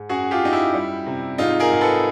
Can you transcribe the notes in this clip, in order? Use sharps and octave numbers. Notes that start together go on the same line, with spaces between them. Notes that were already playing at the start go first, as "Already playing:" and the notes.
Already playing: G#2
F#2 F#4 G#4
F4 G4
F#2 D#4
E4
G3
C3
G#2 D#4 F4
G#4 A#4
G#2
A4 B4